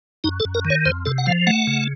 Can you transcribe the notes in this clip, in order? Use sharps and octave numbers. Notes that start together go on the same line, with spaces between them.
F#2 D#4
A4
F#2
A#4
D#3
C#5
F2 C5
C3 A4
F#5
F3 F5
A3 F#5
C#3